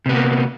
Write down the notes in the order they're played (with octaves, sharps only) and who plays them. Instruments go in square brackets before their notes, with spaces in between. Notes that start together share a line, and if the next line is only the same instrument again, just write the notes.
[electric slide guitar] C3
B3
A#3